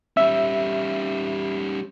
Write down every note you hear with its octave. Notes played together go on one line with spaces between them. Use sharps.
G3 C#4 E5